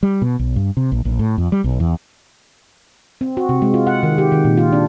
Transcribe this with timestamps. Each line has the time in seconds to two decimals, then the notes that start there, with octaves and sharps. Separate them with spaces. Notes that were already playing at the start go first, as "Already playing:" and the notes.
0.03 G3
0.22 B2
0.39 B1
0.56 G2
0.77 C3
0.92 A#1
1.05 A#1
1.19 A2
1.38 F2
1.52 G3
1.64 B1
1.80 E2
3.21 C4
3.37 F#4
3.49 C3
3.62 G#3
3.74 F4
3.87 F#5
4.03 D#3
4.18 G4
4.32 D#3
4.45 A#2
4.57 F4
4.73 D4